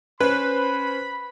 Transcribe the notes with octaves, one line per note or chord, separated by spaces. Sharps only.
C#4 B4 C5 B5